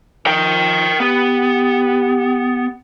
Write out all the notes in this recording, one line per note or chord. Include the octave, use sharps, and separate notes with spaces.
D#3 F3 A#4 G5
B3 G4